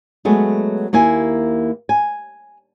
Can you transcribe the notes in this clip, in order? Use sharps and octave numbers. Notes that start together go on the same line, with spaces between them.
F#3 G#3 A3 B3
D#2 A#3 E4 G#5
G#5